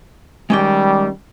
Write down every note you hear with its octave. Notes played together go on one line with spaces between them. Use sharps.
D#3 G3 G#3 C#4 G5